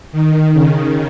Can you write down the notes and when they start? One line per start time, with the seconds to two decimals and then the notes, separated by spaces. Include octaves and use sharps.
0.12 D#3
0.53 C#3